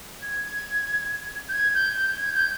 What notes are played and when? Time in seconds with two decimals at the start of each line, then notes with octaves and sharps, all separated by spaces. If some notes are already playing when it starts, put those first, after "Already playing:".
0.22 G#6
1.49 G6
1.53 G#6
1.74 G6
1.96 G6
2.18 G#6
2.34 G6